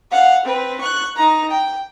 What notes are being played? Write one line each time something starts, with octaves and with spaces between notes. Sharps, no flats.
F5 F#5
C4 B4
C#6 F#6
D#4 A#5
G5